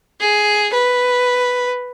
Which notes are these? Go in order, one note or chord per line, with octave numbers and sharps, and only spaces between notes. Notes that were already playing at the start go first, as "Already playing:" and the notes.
G#4
B4